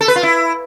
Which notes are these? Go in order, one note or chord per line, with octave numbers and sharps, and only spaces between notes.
A4
B4
F4
E4